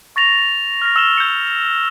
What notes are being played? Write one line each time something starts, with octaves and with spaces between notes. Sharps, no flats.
C#6 A6 A#6 F7
F6 A#6
E6 E7 G7
G6 C#7